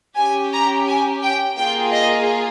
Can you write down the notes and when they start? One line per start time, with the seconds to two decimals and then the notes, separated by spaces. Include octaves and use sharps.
0.17 C#4 G4 G#5
0.53 A#5
0.88 G#5
1.22 G5
1.57 A#3 F4 G#4 G5
1.93 D#5